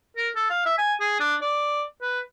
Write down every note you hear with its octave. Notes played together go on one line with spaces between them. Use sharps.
A#4
A4
F5
E5
G#5
G#4
D4
D5
B4